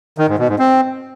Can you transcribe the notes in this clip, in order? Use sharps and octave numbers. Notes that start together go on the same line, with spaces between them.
D#3
G#2
B2
G#2
C4